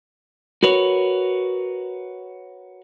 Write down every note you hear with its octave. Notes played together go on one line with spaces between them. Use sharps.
F#4 A#4 B4 C#5